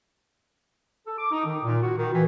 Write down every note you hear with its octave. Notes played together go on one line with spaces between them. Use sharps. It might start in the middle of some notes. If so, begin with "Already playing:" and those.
A4
D6
D#4
D#3
A#2
F#4
D#3
E3